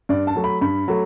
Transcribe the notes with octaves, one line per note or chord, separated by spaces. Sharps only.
G2 D5
A5
F#3 A3
B5
G2 B5
F#3 A3